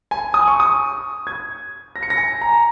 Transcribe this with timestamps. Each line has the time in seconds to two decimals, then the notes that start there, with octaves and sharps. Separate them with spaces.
0.11 G#5
0.34 D#6
0.48 C#6
0.60 D#6
1.27 G#6
1.96 A#6
2.03 C#7
2.10 A#6
2.18 G#5
2.41 A#5